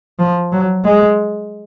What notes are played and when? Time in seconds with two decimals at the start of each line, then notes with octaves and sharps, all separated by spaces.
0.19 F3
0.52 F#3
0.84 G#3